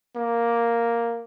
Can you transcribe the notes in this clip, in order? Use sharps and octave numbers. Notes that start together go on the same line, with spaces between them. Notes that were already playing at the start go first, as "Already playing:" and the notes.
A#3